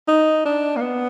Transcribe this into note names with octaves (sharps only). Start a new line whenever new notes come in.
D#4
D4
A#3
B3